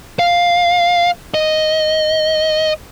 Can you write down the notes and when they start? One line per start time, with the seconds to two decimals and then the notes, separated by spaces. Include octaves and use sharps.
0.19 F5
1.34 D#5